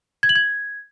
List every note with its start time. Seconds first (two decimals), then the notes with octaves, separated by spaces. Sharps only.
0.23 G#6
0.29 F#7
0.36 G#6